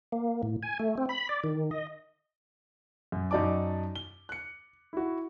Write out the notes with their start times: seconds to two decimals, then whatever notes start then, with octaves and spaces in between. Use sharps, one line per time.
0.12 A#3
0.43 A2
0.63 G#5
0.79 A3
0.98 C4
1.09 B5
1.29 D5
1.44 D#3
1.71 D#5
3.12 F#2
3.31 F#2 D#4 F#4 D5 A5 D6
3.96 G7
4.29 F#6 C#7
4.93 E4 F#4